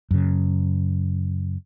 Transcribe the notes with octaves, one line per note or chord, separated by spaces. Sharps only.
F#2 C#3